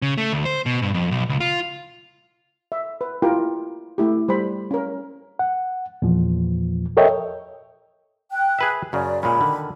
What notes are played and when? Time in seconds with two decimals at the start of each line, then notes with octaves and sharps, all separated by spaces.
0.02 C#3
0.18 A3
0.33 D2
0.45 C5
0.66 B2
0.82 G2
0.94 F2
1.11 B1
1.29 C#2
1.40 F4
2.72 E5
3.01 B4
3.22 E4 F4 G4 A#4 G5
3.98 A3 E4 G4
4.28 G3 C5 B5
4.71 C#4 A#4
5.39 F#5
6.02 E2 A#2 F3
6.97 A4 A#4 C#5 D#5 E5 G5
8.31 G5 F#6
8.59 G#4 B4 E5
8.93 F#2 C#3 D5
9.23 A#2 G#3 C#4 B5
9.41 D3 D#3